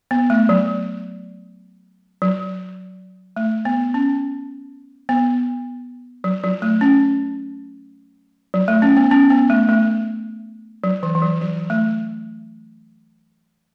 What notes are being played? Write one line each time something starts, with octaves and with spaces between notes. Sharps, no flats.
B3
A3
F#3
F#3
A3
B3
C#4
B3
F#3
F#3
A3
C#4
F#3
A3
C#4
B3
C#4
B3
A3
A3
F#3
E3
E3
F#3
F#3
A3